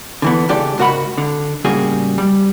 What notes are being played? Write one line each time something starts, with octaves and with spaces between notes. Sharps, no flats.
D3 E3 B3
C#2 G#3 D4 G4 A4 D5
C#2 G#2 F#4 A#4 F#5 B5
D3
A2 C#3 G3 A#3 F#4 G#4
G3